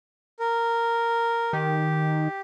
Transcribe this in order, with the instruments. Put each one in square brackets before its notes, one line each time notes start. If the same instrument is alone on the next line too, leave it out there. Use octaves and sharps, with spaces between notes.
[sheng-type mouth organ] A#4
[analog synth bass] D#3 [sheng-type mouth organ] G4